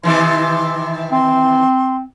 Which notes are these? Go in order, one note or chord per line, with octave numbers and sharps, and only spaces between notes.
C3 D#3 E3 C6
C4 C6